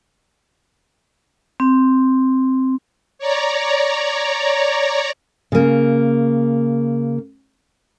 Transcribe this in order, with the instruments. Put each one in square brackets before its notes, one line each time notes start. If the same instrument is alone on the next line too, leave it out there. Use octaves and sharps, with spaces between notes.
[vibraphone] C4
[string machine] C#5 D5 A#5
[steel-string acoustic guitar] C#3 A#3